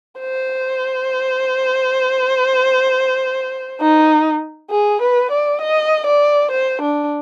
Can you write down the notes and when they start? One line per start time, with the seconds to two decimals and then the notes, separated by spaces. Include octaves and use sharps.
0.20 C5
3.82 D#4
4.71 G#4
5.02 B4
5.31 D5
5.61 D#5
6.06 D5
6.51 C5
6.82 D4